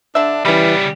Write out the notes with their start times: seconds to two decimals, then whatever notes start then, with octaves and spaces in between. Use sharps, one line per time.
0.15 D3 D4 E5
0.45 C#3 E3 G3 B3 C#4 E4